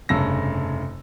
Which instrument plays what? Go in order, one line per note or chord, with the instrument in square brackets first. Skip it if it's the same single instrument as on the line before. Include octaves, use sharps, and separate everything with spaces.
[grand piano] F1 G2 C#3 E6 A#6